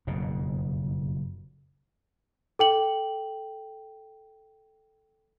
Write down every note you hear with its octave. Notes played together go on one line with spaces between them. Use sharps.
F#1 F2 G#2 B2
A4 G5 F#7